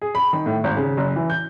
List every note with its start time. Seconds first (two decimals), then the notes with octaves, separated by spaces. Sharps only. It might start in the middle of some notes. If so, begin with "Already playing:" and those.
0.02 G#4
0.15 B5
0.33 D#3
0.46 A2
0.64 G#1
0.77 C#3
0.97 F#1
1.16 E3
1.30 G6